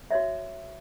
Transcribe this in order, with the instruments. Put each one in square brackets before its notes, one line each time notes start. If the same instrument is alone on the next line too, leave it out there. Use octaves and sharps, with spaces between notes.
[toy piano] F#4 C#5 D5 E5